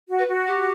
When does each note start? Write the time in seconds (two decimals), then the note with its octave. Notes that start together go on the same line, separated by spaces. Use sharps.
0.09 F#4
0.19 B4
0.29 F#4
0.47 G4